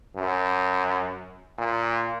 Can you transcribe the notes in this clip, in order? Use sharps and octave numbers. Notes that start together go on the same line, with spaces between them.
F#2
A#2